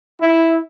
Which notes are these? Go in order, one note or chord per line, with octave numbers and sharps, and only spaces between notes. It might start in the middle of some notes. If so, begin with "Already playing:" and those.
E4